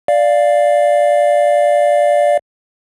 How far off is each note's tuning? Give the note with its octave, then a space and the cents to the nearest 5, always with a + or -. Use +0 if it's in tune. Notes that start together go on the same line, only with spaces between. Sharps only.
D5 +0 F5 +0